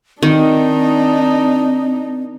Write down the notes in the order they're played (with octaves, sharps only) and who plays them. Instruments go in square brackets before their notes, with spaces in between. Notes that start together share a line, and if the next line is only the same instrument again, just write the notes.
[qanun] D#3 [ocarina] C4 [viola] D4 D#4